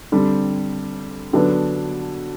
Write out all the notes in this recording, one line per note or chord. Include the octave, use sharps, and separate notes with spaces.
D3 G3 C4
D3 F#3 B3 D4